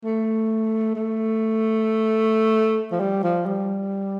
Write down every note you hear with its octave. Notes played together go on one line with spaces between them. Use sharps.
A3
A3
F3
G3
F3
G3